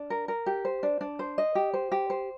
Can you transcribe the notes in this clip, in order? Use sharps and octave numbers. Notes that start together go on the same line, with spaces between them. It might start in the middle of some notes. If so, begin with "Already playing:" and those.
Already playing: D4
A#4
A#4
G4
C5
D4
D4
C5
D#5
G4
C5
G4
C5